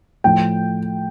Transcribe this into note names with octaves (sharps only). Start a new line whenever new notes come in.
A2 F3 G5